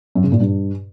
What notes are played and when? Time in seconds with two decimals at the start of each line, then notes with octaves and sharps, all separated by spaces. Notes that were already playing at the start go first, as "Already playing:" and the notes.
0.15 F#2
0.24 C#3
0.32 A#2
0.40 G2